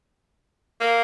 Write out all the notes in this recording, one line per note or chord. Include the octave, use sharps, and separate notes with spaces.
A#3